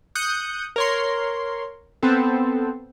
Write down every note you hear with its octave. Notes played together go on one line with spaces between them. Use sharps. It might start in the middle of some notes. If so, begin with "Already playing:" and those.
D#6 F#6 G6 C#7
A#4 C#5 C6
B3 C4 A4